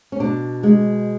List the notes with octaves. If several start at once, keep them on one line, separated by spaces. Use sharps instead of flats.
C#4
B2 D4
G#3